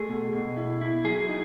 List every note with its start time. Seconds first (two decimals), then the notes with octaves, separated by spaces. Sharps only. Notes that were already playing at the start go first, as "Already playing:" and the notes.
Already playing: A3 G#4
0.09 B2
0.33 B2
0.57 E4
0.81 E4
1.04 F#3 G#4
1.29 D#4